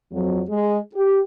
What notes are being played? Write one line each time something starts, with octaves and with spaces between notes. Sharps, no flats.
F2 F#3
G#3 G#4
G4